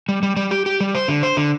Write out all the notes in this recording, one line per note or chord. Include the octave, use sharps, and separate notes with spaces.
G3
G3
G3
G4
G4
G3
C5
D3
C5
D3